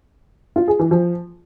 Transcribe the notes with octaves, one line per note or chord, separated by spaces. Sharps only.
F4
G#4
E3
F3